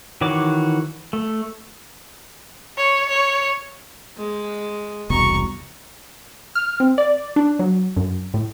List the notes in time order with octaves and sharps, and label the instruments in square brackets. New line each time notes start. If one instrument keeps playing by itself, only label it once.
[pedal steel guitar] D#3 E3 F#4 C#5 D6
A3
[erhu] C#5
C#5
[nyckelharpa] G#3
[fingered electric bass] E1 C2 B2 [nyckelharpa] A#5 C#6
[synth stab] F6
C4
D5
D4
F#3
F#2
A2